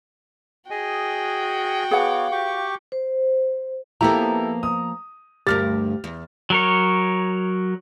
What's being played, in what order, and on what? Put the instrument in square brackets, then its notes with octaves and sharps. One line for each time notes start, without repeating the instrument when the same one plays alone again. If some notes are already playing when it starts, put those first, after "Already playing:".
[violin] F#4 G5 [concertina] G#4 D#5 G#5
[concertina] B3 C#5 D6 [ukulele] G#4 B4 F#5 [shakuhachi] F5
[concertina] G4 C#6 D6
[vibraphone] C5
[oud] F3 A#3 B3 [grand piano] E4 G4 A4 [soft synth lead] A#5
[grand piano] D#6
[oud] D2 G2 A#4 [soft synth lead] G4 [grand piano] F6 A6
[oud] E2
[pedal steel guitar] F#3 A#4 C#5